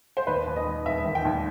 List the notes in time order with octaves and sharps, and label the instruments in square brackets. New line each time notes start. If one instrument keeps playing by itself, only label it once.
[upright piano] C5
D#2 B4
D#2
D#5
D#3
E1 E5
D#3
G5
D#2